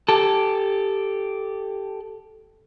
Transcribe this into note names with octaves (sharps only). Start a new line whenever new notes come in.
G4 A4